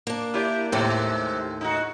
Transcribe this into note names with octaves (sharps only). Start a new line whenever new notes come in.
A#3 D4
E4 G4 D5
D#2 A2 C3 G#3
D#4 F#4